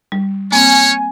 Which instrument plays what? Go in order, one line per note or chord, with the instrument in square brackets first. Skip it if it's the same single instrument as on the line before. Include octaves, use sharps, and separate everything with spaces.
[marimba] G3
[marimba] A#3 C4 [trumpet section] C#4 C#5 [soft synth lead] G#5